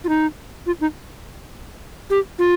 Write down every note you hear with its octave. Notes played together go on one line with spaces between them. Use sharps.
F4
D#4
F4
D#4
G4
F4